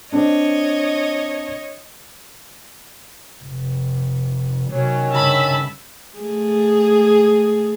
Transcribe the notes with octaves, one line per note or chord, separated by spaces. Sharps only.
C4 D4 C#5 D#5
F1
C3 D#3 F#3 C#4 C#5
G2 C#3 E5 A5 B5
A3 G#4